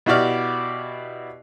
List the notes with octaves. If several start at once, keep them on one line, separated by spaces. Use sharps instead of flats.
B2 E4 F#4 G4 D5 F6